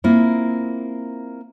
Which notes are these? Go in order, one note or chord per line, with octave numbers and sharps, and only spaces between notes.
A#3 C4 E4 F4